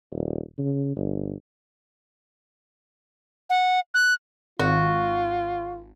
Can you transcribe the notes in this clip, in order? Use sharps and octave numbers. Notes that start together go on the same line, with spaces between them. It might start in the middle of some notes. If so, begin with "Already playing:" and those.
D#1
C#3
G1
F#5
F#6
G#1 F4 F#4